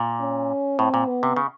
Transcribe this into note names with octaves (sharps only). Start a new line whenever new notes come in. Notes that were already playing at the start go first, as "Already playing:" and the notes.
Already playing: A#2
C#4
A2 C4
A#2
B3
C3
C#3